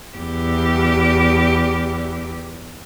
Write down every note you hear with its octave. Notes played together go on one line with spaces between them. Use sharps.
E2 G4